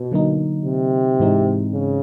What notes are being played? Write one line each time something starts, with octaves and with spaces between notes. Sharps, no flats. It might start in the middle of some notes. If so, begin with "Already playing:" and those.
Already playing: B2
D3 F#3 A#3 D#4
C3
G#2 E3 G#3 C4 D#4
C#3